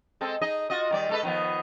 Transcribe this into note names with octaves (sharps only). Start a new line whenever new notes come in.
G#3 C4 A4
D#4 G#4 D#5
F4 F#4 D#5
D#3 G3 D5
G#3 A4 B4
D#3 F3 B3